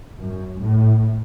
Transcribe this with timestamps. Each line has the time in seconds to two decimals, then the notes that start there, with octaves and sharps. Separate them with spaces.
0.20 F#2
0.62 A2